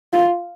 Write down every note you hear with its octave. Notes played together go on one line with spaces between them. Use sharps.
F4